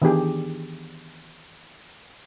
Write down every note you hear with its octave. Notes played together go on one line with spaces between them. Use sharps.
D#3 E3 B3 D4 G4 G#4